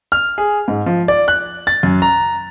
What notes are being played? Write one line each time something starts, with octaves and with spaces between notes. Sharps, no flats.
F6
G#4
G#2
F3
D5
F#6
A6
F#2
A#5